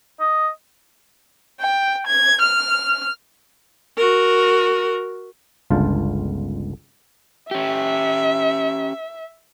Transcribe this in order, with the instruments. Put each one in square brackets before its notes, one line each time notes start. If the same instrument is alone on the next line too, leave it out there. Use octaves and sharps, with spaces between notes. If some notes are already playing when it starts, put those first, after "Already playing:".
[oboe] D#5
[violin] G5
G#6
F6
[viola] F#4 A#4
[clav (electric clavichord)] G1 C#2 D3 F4 A5
[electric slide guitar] C#4 G4 [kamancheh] E5